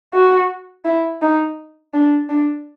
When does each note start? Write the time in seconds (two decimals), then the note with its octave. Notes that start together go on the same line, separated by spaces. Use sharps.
0.14 F#4
0.85 E4
1.21 D#4
1.94 D4
2.29 D4